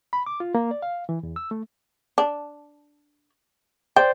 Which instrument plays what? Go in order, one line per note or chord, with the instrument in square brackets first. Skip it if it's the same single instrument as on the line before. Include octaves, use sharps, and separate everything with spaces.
[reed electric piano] B5
D6
F4
A#3
D5
F5
E3
E2
E6
A3
[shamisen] D4
[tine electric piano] C5 D5 [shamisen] G5